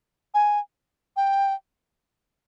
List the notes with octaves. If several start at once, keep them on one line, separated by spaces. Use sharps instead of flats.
G#5
G5